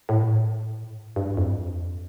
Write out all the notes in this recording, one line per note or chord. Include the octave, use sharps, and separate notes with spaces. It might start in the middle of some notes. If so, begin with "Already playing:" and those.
A2
G2
F2